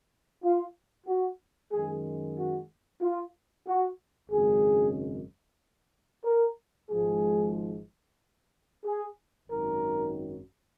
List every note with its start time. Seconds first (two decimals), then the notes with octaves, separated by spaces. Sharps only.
0.43 F4
1.07 F#4
1.72 F#2 D#3 G#3 G#4
2.37 F#4
3.01 F4
3.66 F#4
4.30 G#1 F#2 C#3 G#3 G#4
6.25 A#4
6.90 G#1 G#2 F3 G#3 G#4
8.85 G#4
9.48 G#1 F#2 D#3 F#3 A#4